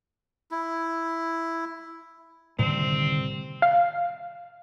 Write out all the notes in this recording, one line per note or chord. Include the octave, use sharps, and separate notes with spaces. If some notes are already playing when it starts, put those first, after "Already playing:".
E4
C2 A2 D3 D#3 C4
F5